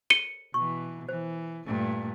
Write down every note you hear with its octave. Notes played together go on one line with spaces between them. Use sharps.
C#7 D#7 G7
B2 E3 C#6
E3 C5
G2 A#2 A3